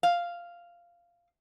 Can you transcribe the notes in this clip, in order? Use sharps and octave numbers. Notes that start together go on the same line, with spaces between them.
F5